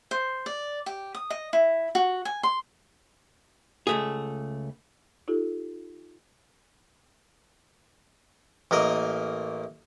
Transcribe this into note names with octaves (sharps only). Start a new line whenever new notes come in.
C5
D5
G4
D#6
D#5
E4
F#4
G#5
C6
C#2 A3 G#4
D#4 F4 G4 A4
A1 A#3 A#4 D#5